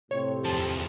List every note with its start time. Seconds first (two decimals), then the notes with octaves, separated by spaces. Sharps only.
0.11 A2 C3 C4 C#5
0.45 E2 F3 A5